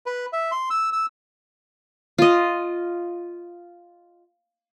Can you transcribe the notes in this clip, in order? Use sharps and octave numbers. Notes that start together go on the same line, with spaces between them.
B4
E5
C6
E6
E6
F4 D#5